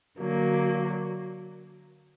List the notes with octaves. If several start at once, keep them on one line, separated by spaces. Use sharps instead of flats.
D3 F#3 A#3